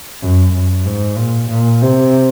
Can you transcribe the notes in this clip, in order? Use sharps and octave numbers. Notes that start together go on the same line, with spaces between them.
F#2
F#2
G#2
A#2
A#2
C3